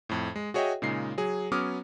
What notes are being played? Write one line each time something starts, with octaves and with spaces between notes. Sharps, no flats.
F2 A2
G#3
F#4 G#4 C#5 D#5 E5 G5
A#2 C#3 G#3 D#4 C7
F#3 G#4
F#3 B3 C#4 D6 D#6 F6